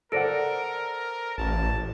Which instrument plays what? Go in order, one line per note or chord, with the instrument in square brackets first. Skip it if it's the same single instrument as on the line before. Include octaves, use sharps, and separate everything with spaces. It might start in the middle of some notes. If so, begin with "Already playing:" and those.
[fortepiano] A4 D5 F#5 [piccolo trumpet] A#4 [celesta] C5 A#6 D7
[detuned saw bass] A1 [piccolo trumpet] A5